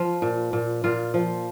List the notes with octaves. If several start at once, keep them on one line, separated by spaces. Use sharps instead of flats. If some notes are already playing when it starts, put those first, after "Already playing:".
Already playing: F3 F4
A#2
A#2
A#2 F4
F3